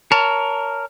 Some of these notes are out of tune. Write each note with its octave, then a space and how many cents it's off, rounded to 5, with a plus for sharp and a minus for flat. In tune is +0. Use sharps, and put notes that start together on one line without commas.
A#4 +0 C#5 +25 A5 +5